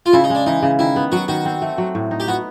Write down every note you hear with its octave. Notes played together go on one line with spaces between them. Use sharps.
F4
C#3 E4
D#4
G#3 D4
E3 D#4
C#3
D#3 E4
B3
F#3 F#4
D#3 F#4
C4
A3
F#3
A2
D#4
G4
B3 F#4